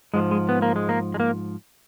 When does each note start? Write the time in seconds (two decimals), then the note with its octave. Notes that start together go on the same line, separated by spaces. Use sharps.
0.14 G#2 F3 G#3
0.31 G#3
0.49 B3
0.62 A#3
0.76 G#3
0.89 A#3
1.14 G#3
1.20 A#3